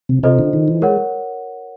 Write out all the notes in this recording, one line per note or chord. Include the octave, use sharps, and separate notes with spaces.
C3
C3 F4 A4 C5 D#5
D3
D#3
E3
G#3 A#4 C#5 F#5